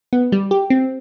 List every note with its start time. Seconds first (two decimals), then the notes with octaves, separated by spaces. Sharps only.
0.13 B3
0.32 G3
0.51 G4
0.70 C4